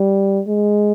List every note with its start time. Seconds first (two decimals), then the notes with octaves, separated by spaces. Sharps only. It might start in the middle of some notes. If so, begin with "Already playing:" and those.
Already playing: G3
0.47 G#3